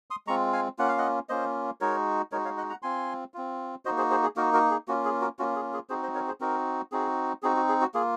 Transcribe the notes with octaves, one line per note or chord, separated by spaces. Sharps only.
C6 D#6
G#3 C4 F4 A#5 C#6
F5 G#5
A#3 C#4 F4 F#5
F5
D#5 F#5
A#3 C#4 F4 C5 D#5
G#3 D#4 F#4 A#4 C#5
G#3 D#4 F#4 A#4 C#5
C#5 F5
D#5 F#5
F#5 A#5
C4 F4 G#5 C6
C4 F4
A#3 D#4 F#4 C5 D#5
G#4 C5
G#4 C5
G#4
A#3 D#4 F#4 A#4
F#4 A#4
G#4
A#3 C#4 F4 F#4
G#4
F#4 A#4
A#3 C#4 F4 F#4
G#4
G#4
C4 D#4 F#4 G#4 C5
C5 D#5
A#4 C#5
G#4 C5
C4 D#4 F#4 A#4
C4 D#4 F#4 G#4
C4 D#4 F#4 G#4
F#4
G#4
F#4
A#3 F4 G#4